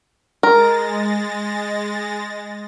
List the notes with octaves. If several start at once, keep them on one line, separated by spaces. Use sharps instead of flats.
G#3 A#4 A6 A#6